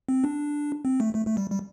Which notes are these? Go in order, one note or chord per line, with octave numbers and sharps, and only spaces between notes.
C4
D4
C4
A3
A3
A3
G3
G3